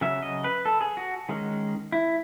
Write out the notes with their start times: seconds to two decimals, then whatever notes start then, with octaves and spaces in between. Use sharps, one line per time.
0.01 C#3 F#3 C#4 E5
0.23 D#5
0.44 B4
0.65 A4
0.81 G#4
0.97 F#4
1.29 D#3 G#3 C#4
1.92 E4